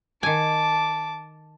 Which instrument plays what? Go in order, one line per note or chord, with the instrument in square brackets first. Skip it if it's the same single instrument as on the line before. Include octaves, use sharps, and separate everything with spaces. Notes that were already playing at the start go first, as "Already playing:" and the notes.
[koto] D#3 G#5 [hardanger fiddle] A5 D6